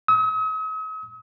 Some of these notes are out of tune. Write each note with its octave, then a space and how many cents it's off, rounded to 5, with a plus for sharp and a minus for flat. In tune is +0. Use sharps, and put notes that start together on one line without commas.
D#6 +45